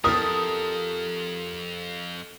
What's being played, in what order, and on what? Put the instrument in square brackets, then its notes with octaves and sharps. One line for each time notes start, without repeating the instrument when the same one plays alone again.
[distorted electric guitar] F2 [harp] G4 A4 [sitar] A#4 [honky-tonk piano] D#6